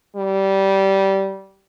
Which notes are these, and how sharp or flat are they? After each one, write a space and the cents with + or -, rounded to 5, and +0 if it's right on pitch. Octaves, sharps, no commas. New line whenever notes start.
G3 -15